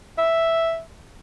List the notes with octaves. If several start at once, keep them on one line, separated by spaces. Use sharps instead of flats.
E5